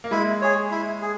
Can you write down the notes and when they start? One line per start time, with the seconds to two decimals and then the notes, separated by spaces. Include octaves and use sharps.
0.04 A#3
0.11 G#3 E4
0.42 G#4 C#5
0.71 E4
1.02 G#4